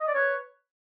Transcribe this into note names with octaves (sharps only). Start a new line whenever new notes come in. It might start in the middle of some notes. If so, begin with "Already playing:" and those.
D#5
D5
B4 C#5